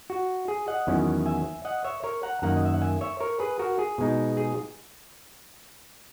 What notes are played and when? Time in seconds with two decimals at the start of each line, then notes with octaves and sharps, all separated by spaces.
0.10 F#4
0.48 G#4
0.68 D#5 F#5
0.87 E2 D#3 F#3 C#4 E4
1.26 E5 G#5
1.65 D#5 F#5
1.84 C#5 E5
2.04 A#4 C#5
2.23 F#5 A#5
2.42 F#2 D#3 A#3 F#5 A#5
2.57 D#5
2.65 E5
2.74 F#5
2.81 E5 G#5
3.01 C#5 E5
3.20 A#4 C#5
3.40 G#4 B4
3.59 F#4 A#4
3.79 G#4
3.98 B2 G#3 D#4
4.37 G#4